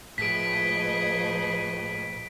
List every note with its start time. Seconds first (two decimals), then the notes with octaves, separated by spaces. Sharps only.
0.18 A2 F3 G#4 B4 D#5 B6 D7